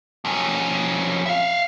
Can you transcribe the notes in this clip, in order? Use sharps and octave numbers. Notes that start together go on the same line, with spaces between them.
F2 C#4
E5 F5